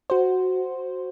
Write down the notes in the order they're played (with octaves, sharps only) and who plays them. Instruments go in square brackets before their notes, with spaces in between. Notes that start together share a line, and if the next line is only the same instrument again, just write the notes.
[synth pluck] F#4 C5